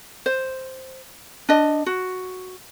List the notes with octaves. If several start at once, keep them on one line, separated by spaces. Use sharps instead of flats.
C5
D4 D#5
F#4